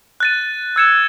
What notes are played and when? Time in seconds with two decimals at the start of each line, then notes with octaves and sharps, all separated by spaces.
0.20 F#6 A6 D#7
0.76 E6 G#6 C#7 E7